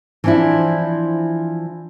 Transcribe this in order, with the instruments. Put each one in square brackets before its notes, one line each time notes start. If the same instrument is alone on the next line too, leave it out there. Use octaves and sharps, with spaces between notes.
[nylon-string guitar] E3 F3 C4 D4 E4